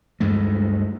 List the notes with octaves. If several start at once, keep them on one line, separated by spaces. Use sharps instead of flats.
D2 G2 G#3 A3